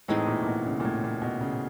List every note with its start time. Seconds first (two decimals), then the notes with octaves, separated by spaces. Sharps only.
0.08 A2 E3 G#3 C4 D#4
0.27 A#2
0.42 A#2
0.46 B2
0.66 C#3
0.80 A#2
0.85 A2
1.04 A#2
1.22 B2
1.41 C#3